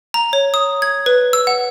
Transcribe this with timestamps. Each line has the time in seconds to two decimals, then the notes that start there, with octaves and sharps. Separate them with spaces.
0.14 A#5
0.33 C#5
0.54 D#6
0.82 G#6
1.06 B4
1.33 E6
1.47 F#5